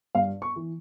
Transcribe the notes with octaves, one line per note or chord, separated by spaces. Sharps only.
G2 F5
C#6
E3